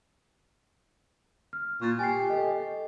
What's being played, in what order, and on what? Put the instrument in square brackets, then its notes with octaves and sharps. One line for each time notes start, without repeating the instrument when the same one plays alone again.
[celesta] F6
[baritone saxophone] A#2 [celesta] C#6 A6
[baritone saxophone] G4 [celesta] G#5 C7
[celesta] A4 D#5